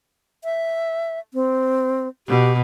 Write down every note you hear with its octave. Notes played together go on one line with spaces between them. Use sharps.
E5
C4
B2 G4